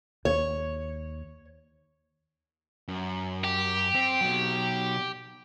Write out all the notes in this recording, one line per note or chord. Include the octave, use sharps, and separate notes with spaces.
D#2 C#5
F#2
G4
C4
B2 F#3